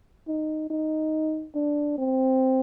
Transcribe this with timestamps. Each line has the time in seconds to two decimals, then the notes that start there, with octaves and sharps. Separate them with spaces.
0.28 D#4
0.70 D#4
1.55 D4
1.98 C4